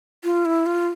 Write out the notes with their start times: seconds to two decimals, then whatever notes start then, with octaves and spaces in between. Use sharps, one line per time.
0.24 F4
0.45 E4
0.66 F4